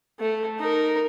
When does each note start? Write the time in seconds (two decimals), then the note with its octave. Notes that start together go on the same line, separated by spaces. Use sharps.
0.20 A3
0.59 D#4 A#4